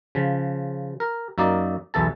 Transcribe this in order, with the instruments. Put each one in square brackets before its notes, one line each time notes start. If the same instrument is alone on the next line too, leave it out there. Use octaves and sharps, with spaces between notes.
[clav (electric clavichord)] C#3 F3
A#4
F#2 A#3 D#4 D5
B1 E2 E3 A4 A5